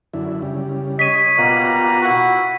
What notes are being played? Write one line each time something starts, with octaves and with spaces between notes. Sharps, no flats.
F#2 D3 E4
C#3 G3
C#5 D#5 B6 D#7
B2 G3 A#3 F4 F#5 A#5
E4 F#4